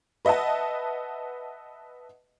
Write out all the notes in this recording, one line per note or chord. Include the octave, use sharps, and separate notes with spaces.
B4 D#5 E5 F#5 A5